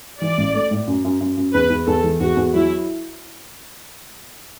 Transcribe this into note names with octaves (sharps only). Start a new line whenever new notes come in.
E3 D5
A1
A3
A2
F#2
F#2
F#2
F#2
E2 B4
E2
E2 A4
E3
E2 F#4
E2
F#3 E4